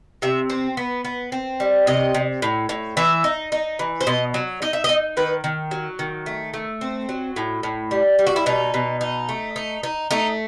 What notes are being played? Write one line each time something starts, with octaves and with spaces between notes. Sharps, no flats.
C3 E5
C4
B3
B3
C4
G3
C3 D#5
C3
A2
A2
E3 E5
D#4
D#4
E3
C5
B2 D#5
F#3
D#4 D#5
E5
D#5
D#4
D#3 B4
D#3
F#3
D#3
A3
A3
C4
F#3
A2
A2
G3
G3
F#4
E4
B2 D#4
B2
D#4
A3
D#4
D#4
A3 D#4